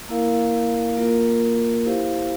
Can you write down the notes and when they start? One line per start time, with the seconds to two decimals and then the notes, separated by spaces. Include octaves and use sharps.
0.09 A#3 E4 A#4 F5
0.97 A#3 F4 A#4
1.85 E4 G4 C5 F5